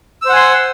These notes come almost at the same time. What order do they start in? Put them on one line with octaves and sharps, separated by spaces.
E6 C5 F#5 G#5 C6